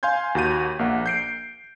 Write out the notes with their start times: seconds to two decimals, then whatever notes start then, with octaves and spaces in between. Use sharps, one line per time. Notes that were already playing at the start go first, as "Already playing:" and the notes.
0.03 F5 G#5 C6 G6 G#6
0.35 D#2 F#4 G6 D#7
0.79 A#1 A#3 F#5
1.06 G6 C7 D7